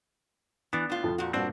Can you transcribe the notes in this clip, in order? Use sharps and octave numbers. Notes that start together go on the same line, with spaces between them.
E3 B3 D4
A2 F4
F2 F3 A4
A#2 F#4
G2 A#2 C4 D4 F#4